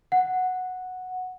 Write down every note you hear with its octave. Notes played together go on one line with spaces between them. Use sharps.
F#5